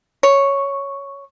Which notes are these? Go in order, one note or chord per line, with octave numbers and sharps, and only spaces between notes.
C#5